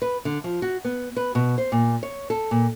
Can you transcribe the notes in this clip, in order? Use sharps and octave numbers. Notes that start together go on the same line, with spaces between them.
B4
D3
F3
F#4
B3
B4
B2
C5
A#2
C#5
A4
A#2